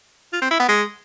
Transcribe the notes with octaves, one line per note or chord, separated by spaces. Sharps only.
F4
C4
E4
B3
G#3